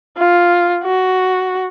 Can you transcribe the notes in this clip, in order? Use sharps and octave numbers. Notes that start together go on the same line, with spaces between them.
F4
F#4